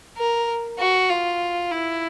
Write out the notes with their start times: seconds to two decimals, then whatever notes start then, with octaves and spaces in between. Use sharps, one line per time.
0.18 A#4
0.79 F#4
1.10 F4
1.71 E4